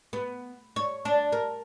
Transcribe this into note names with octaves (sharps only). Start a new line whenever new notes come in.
B3
C#5
D4
A#4